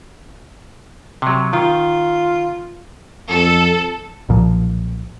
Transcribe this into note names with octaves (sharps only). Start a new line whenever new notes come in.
C3 F#3
D#3 F4
F2 A4
B1 A#2 F3